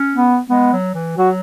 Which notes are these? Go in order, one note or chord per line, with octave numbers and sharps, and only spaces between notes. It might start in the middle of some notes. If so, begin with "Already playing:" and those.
Already playing: C#4
B3
G#3 B3
F#3
E3
F#3 F#4